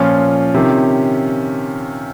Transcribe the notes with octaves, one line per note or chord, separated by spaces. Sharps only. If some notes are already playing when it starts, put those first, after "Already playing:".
Already playing: A#2 F3 C#4 F4
C3 D#3